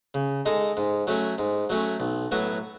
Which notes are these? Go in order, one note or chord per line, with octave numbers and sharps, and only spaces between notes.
C#3
G#3 D#4 A4
G#2
F#3 A3 C#4
G#2
F#3 A3 C#4
B1
A2 F#3 B3 F#4